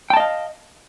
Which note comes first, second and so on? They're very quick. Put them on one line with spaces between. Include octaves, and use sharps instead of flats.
G5 A5 D#5 F5